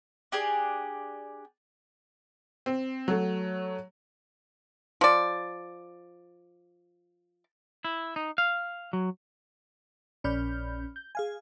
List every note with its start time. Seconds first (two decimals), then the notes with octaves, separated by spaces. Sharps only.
0.32 D4 G4 G#4 D5
2.66 C4
3.08 F#3 A3
5.01 F3 D5
7.85 E4
8.16 D#4
8.38 F5
8.93 F#3
10.24 A#1 C#4 D5 B5 F6 G6
10.96 G6
11.15 G#4 F5 G#5